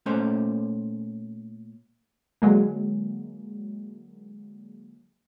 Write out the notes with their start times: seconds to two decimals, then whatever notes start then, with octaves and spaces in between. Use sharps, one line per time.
0.06 A#2 A3 C#4 C5
2.42 D3 F#3 G#3 A#3